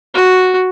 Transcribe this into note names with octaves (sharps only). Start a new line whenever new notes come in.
F#4